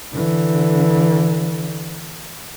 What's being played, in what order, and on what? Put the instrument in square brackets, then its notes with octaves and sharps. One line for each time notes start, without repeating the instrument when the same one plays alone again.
[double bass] D3 E3